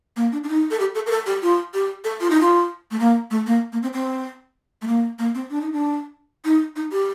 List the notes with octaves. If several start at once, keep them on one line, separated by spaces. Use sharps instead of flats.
A#3
D4
D4
D#4
A4
G4
A4
A#4
A4
G4
F4
G4
A4
F4
D#4
F4
A3
A#3
A3
A#3
A#3
C4
C4
A3
A#3
A#3
C4
D4
D#4
D4
D#4
D#4
G4